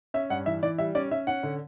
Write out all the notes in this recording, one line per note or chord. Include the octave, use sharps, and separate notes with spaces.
C#4 E5
G2 F#5
E3 E5
E3 D5
G3 E5
C#4 D5
C#4 E5
C#4 F#5
D3